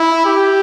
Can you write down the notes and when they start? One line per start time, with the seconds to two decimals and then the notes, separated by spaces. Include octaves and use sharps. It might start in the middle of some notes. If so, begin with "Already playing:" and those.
Already playing: E4
0.25 G4